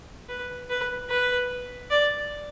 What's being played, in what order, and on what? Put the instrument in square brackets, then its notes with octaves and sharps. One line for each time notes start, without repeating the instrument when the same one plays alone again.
[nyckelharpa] B4
B4
B4
D5